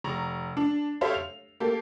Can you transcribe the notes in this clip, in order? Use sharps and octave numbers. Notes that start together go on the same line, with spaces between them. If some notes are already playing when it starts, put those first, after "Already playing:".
F1 A#5 C#6
D4
G4 A4 C5 C#5 E5 F5
F7
A#3 G4 A4